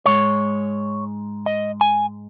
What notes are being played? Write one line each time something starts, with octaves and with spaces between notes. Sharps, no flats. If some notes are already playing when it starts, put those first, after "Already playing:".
G#2 G#3 C#5
D#5
G#5